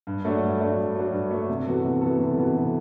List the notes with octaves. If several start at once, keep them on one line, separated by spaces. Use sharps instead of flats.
G2
F#3 A3 D4 F#4
G2
F#3 A3 D4 F#4
G2
F#3 A3 D4 F#4
G2
F#3 A3 D4 F#4
C3
E3 B3 F#4 A4
C3
E3 B3 F#4 A4
C3
E3 B3 F#4 A4
C3